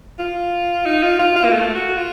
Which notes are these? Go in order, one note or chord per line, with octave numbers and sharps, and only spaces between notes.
F4
D#4
F4
F4
F4
A#3
A3
F#4
F4